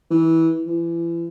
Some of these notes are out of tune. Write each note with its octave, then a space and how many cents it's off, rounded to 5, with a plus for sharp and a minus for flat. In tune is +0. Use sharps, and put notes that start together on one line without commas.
E3 -15
E3 +35